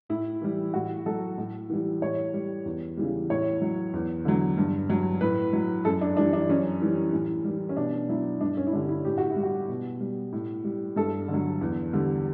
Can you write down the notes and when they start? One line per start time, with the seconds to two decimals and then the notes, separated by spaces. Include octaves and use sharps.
0.09 A2 E4
0.42 E3 G3
0.74 A2 F#4
1.06 F#3 A4
1.38 A2
1.70 E3 G3
2.02 A2 C#5
2.34 G3
2.65 E2
2.97 C#3 E3 G3
3.30 A2 C#5
3.62 F#3
3.94 E2
4.25 D3 F#3
4.57 G2
4.89 F#3
5.21 A2 B4
5.53 F#3
5.85 F#2 A4
6.01 D4
6.17 E3 G3 D4
6.33 D4
6.49 F#2 C#4
6.82 E3 G3
7.13 A2
7.44 E3 G3
7.69 C#4
7.77 B2 D4
8.09 F#3 E4
8.41 G2 D4
8.57 C#4
8.67 E4
8.73 D3 G3 D4
8.89 E4
9.05 A2 G4
9.18 F#4
9.31 E4
9.36 G3
9.43 F#4
9.69 B2
10.00 G3
10.32 A2
10.64 G3
10.96 G2 A4
11.28 D3
11.33 F#3
11.61 E2
11.93 D3 G3